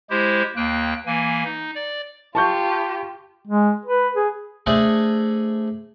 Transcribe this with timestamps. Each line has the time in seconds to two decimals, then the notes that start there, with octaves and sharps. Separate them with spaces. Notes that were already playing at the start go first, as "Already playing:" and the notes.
0.10 G#3 E4 G4 C5
0.56 D#2 A#3 G5 F#6
1.06 E3 A#3 G#5
1.44 D#4
1.75 D5
2.35 F4 G4 A5 C#6 G6
3.47 G#3
3.86 B4
4.15 G#4
4.66 A3 D4 G#4 C5 D#5